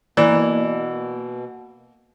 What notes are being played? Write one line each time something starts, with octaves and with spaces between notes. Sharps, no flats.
B2 E3 A#3 D5